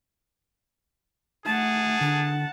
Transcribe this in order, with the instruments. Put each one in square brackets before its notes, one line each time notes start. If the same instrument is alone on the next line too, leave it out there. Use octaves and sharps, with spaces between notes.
[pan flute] A3 [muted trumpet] G#4 [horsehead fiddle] F#5 A5
[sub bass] D3 [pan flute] D4